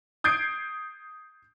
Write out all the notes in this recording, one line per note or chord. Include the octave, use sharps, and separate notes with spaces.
D#6 G6 G#6 C7 D7